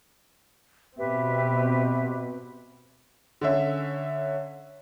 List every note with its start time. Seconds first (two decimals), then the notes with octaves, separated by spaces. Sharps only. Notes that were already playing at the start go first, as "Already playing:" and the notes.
0.97 B2 C4 G4 B4 E5
3.41 D3 C#4 E5